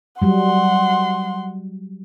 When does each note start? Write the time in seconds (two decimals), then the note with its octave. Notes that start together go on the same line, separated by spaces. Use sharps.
0.22 F#3 G3 F#5 C6